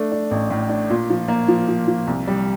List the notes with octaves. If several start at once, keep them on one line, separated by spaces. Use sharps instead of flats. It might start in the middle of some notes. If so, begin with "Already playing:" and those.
Already playing: A3 D4
D4
A1
A2
D4
A#2
F3
A#3
F3
F3
F3
C2
G3